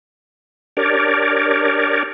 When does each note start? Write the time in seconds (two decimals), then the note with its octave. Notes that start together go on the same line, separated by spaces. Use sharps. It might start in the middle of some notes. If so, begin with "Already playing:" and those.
0.77 D4 G4 A#4 C#5 D5